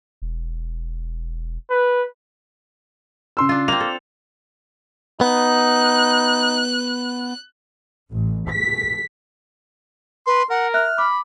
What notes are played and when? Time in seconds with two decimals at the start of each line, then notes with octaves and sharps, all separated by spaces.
0.22 E1
1.70 B4
3.37 C#3 C6 E6
3.49 D4 F4
3.68 A#3 C4 F7
3.80 A4
5.21 B3 D#4 F#6
8.11 A1
8.49 B6
10.27 B4 C6
10.50 A#4 F#5
10.74 E5 F6 F#6
10.98 B5 D6